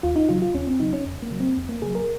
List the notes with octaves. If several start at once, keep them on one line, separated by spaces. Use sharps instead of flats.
D#2 F4
D#4
C#3 F#3 F4
F4
D#2 C#4
C4
C#3 F#3 D#4
C#4
F2
A#3
C#3 F#3
C4
F2
A#3
C#3 F#3 G#4
A#4